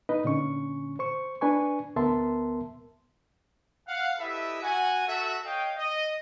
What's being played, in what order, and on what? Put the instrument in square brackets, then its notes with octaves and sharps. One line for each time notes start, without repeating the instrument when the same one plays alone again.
[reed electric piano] D#4 B4 D#5
A#2 D3 C#4 C#6
C5 C#6
D4 B4 G#5 C#6
D2 B3 A#4 E5 A5 C6
[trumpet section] F5 F#5
E4 G4 A4 B4 D#5 E5
F#4 F#5 G#5
F#4 A4 E5
C#5 D#5 F5 G5
D#5